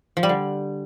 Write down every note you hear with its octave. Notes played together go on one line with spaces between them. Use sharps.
F3
G3
D3